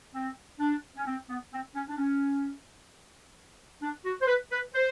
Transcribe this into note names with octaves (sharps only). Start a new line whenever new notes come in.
C4
D4
C#4
C4
B3
C4
C#4
D4
C#4
D4
F#4
C5
B4
B4
C5